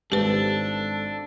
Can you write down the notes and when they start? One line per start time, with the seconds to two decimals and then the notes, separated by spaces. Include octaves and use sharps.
0.12 G#1 D4 G4 A4 B4